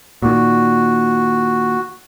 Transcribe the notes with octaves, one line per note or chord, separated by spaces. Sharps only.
A#2 D#3 F#4